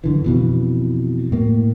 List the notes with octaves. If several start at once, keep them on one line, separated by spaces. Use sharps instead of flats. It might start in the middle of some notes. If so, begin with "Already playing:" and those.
F#2 D3 E3
F2 B2 E3
A2 A#3